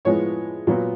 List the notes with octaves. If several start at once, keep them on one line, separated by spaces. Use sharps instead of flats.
A2 F3 G#3 B3 C#5
A#2 F#3 B3